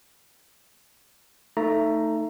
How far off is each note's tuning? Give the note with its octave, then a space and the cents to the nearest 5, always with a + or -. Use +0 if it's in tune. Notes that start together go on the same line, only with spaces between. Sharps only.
A3 +20 D#4 +0 A#5 +0